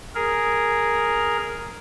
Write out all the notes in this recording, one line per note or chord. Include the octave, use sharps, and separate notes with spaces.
G#4 A#4